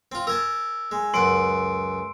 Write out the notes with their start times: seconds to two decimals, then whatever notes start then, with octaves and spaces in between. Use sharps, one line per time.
0.12 C4 F4
0.27 A#4 G#5 A5 E6
0.91 G#3
1.14 C#2 F#2 F#5 C6 C7 D7